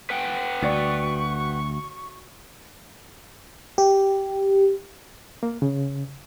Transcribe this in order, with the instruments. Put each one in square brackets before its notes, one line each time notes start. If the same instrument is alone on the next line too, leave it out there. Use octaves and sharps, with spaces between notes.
[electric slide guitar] B4 F#5 G5
[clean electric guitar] D2 [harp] F#4 D5 [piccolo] C#6
[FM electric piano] G4
[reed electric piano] A#3
C#3